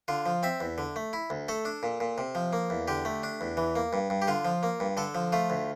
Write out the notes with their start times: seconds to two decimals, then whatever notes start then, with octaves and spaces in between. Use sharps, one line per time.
0.08 D3 F4
0.26 F3
0.43 C4 E5
0.61 E2
0.78 D3
0.96 A3
1.13 E4
1.30 D2
1.49 A3 A4
1.65 D4
1.83 A#2
2.00 A#2
2.18 C3
2.35 F3
2.53 A#3
2.70 E2
2.88 D3 G4
3.05 A3
3.23 D4
3.41 E2
3.57 E3
3.76 A#3
3.93 G2
4.10 G2
4.22 G4
4.28 D3 F4
4.45 F3
4.63 A#3
4.80 G2
4.97 D3 A4
5.15 F3
5.32 A3 F4
5.50 D2